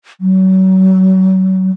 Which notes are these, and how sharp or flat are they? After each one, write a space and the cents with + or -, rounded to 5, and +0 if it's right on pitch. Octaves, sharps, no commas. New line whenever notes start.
F#3 +30